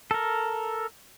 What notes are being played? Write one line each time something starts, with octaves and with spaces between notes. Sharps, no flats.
A4 A#4